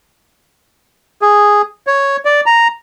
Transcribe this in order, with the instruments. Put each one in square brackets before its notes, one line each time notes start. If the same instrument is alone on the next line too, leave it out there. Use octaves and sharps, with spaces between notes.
[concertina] G#4
C#5
D5
A#5